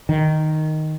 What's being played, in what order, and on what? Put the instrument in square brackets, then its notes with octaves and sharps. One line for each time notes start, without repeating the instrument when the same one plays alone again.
[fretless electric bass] D#3